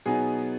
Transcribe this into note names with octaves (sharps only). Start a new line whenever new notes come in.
B2 F#3 B3 D#4 G#4